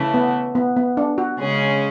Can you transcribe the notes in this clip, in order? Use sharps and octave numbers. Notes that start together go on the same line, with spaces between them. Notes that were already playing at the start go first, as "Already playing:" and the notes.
Already playing: C#3 E3 A3 E4
B3
B3
B3
D4
F#4
C#3 G#3 C#4 G#4